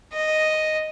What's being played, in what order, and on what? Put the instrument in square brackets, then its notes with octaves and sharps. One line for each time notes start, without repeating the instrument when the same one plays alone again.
[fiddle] D#5